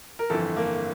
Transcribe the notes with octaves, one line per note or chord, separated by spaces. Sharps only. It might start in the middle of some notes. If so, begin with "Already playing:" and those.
A#4
G1 F2 E3 A4
A#3